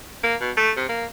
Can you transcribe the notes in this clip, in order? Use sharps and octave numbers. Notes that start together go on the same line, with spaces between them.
A#3
B2
A3
C3
A#3